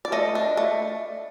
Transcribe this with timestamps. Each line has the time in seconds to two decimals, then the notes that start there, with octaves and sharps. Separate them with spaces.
0.05 D5
0.12 A3 D#5
0.35 D4
0.57 A3